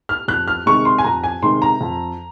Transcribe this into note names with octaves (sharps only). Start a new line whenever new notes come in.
F6
F2 F#6
F6
C3 D#3 G#3 C#6
C6
G#5
F2 A#5
G#5
C3 D#3 G#3 C6
A#5
F2